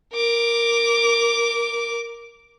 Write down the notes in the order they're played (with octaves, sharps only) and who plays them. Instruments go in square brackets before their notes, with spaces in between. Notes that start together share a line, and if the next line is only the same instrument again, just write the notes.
[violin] A#4 D6